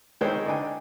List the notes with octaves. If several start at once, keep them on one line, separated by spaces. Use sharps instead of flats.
D#3 G#3 B3 C4 C5 C#5
D3 D#4 G5 G#5